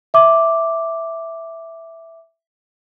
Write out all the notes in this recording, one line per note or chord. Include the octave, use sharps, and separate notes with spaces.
E5 D6